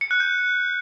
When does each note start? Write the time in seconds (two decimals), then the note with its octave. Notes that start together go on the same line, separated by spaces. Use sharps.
0.01 C#7
0.11 F#6
0.20 G6